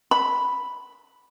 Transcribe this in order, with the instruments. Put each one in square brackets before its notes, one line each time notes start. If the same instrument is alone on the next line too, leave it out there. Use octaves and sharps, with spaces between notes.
[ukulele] B5